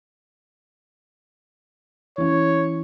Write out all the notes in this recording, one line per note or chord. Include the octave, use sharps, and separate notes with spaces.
E3 C#4 C#5